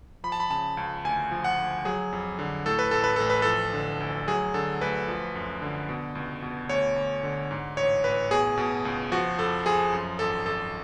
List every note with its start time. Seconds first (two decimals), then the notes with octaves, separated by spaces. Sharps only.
0.24 F3 B5
0.32 A5
0.40 B5
0.50 C#3 A5
0.77 C#2
1.05 D2 G#5
1.31 F3
1.44 F#5
1.58 D2
1.85 F#3 G#4
2.12 F2
2.39 D3
2.66 A2 A4
2.79 B4
2.91 A1 A4
3.04 B4
3.16 A1 A4
3.30 B4
3.42 F3 A4
3.73 D3
4.00 D2
4.28 F#3 G#4
4.54 D3 A4
4.81 D2 B4
5.08 F3
5.35 F#2
5.62 D3
5.89 B2
6.15 C#2
6.42 B2
6.69 D2 C#5
6.96 D2
7.23 D3
7.51 G#2
7.77 A1 C#5
8.04 A1 B4
8.31 B2 G#4
8.58 B2
8.85 C#2
9.12 F3 F#4
9.38 F2 A4
9.66 F3 G#4
9.92 F#2
10.19 G#1 A4
10.46 G#1 A4